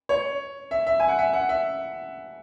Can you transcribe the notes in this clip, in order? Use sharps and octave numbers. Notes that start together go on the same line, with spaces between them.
C#5
E5
E5
G#5
F#5
E5
F#5
E5